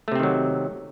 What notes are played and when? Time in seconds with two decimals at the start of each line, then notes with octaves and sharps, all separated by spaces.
0.08 A3
0.12 C3
0.16 C4
0.19 D#3
0.23 F#3